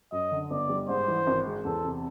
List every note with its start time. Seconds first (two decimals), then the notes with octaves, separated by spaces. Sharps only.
0.12 F#2 D#5
0.32 D3
0.51 G1 D5
0.69 G3
0.89 G#2 C5
1.08 E3
1.27 G#1
1.47 G#3
1.65 E2 A4
1.85 C3